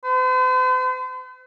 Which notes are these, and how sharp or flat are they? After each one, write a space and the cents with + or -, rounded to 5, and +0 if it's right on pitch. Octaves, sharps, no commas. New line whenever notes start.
C5 -45